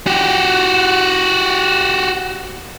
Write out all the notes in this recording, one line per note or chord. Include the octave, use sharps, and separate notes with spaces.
F#4 G4